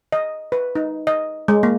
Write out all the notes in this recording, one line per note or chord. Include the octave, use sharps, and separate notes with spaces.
D#5
B4
D#4
D#5
G#3
A#3